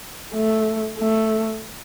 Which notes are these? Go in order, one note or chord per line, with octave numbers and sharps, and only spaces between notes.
A3
A3